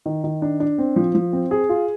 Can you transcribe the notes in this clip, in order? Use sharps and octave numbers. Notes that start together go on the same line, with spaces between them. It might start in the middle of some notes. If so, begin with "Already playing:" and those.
D#3
D#3
D4
D4
C4
F3
F3
C4
G#4
F4